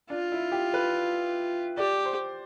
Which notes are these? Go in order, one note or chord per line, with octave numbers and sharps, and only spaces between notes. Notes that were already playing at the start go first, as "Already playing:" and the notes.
D4 F4
E4
G4
B4
G4 D5
C5